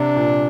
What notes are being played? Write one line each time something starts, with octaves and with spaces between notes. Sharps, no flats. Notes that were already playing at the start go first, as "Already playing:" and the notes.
Already playing: C3 D4
A#2